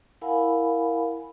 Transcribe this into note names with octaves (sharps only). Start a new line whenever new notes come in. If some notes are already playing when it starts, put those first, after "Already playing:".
E4 A#4 F5 F#5 G#5 B5